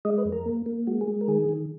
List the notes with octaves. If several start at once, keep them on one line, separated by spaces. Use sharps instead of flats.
G#3 D#5
B4
F2
A#4
A#3
A#3
G#3 F#4
G#4
G#3
A#4
D#3 G#4
D#3